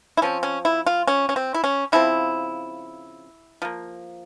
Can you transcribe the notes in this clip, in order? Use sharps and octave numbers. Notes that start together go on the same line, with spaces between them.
E4
F3 C4 C#4
C#4
E4
F4
C#4
C#4
C4
E4
C#4
C#3 F3 C4 E4
F3 A#3